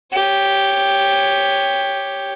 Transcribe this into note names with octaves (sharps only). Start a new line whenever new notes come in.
G4 C#5